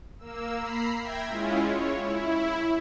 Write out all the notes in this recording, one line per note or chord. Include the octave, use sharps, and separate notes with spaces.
A#3 E6
A#5 B5 C7
E5 G5 G#6 A#6
G#3 C#4 E4 F4
C#5
E4